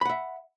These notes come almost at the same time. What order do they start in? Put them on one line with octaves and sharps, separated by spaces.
B5 F#5 E5